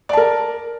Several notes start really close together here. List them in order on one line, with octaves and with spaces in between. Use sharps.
D5 A5 A#4